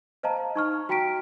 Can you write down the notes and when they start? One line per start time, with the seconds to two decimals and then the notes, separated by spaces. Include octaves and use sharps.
0.23 C5 D#5 F5 A5 A#5
0.56 D#4 C#6 F6
0.89 F#4 G5 A#5 B6 D7